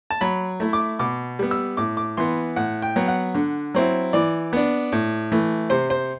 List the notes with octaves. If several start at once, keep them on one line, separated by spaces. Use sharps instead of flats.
A5
F#3 B5
A3 E4
D6
B2 D6
G3 B3
E6
A2 D6
D6
E3 B3 C6
A2 F#5
G5
F#3 B3
F#5
D3
F#3 C4 E4
E3 D5
B3 D4
A2
E3 A3
C3 C5
C5